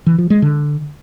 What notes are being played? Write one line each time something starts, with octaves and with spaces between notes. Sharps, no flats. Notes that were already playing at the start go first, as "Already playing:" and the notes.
E3
F3
G#3
D3